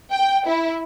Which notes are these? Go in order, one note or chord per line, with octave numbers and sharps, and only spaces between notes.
G5
E4